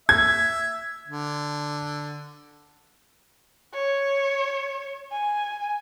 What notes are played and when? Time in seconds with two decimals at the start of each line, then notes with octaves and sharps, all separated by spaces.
0.09 E5 G#6
1.08 D3
3.74 C#5
5.12 G#5